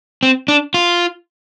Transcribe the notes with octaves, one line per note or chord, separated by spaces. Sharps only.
C4
D4
F4